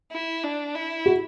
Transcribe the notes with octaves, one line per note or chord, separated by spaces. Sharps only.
E4
D4
E4
F#4